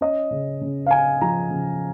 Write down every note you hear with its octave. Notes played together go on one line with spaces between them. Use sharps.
C#4 D#5
C#3
C#3
F5
C#3 G#5
F3 A#5
C#3